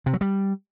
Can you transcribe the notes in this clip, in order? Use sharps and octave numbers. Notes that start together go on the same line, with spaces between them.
C3
F#3
G3